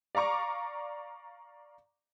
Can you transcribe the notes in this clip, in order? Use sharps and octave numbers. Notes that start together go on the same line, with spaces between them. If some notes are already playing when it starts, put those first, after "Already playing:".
D5 F5 A#5 C#6 D6